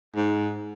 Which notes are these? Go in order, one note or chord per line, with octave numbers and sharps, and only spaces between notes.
G#2